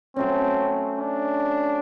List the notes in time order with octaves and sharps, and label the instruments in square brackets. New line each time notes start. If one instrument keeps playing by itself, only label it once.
[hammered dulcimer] F#3 A3 C#4 [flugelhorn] C4
[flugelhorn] D4